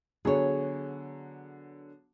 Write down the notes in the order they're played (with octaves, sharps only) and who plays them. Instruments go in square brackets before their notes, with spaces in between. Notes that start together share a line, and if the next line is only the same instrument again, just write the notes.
[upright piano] D3 F#3 B3 [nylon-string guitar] G#4 C#5